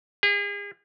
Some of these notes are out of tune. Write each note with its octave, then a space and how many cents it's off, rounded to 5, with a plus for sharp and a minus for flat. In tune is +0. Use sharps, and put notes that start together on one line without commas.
G#4 -40